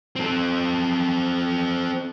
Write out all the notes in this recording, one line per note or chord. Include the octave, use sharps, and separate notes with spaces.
C4 A4